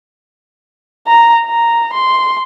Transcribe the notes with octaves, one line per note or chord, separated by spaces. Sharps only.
A#5
A#5
C6